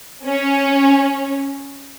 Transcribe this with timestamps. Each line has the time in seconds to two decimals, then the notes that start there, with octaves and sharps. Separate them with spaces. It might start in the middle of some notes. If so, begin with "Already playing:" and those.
0.25 C#4